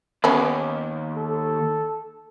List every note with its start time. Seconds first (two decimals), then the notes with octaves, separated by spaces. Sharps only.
0.24 D#2 B3 C#4
1.16 A4